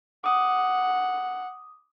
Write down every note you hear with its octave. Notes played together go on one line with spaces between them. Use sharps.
F#5 D6 D#6